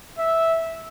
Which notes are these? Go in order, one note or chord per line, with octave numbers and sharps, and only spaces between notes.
E5